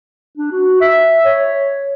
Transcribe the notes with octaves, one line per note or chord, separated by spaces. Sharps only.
D4
F#4
E5
C#5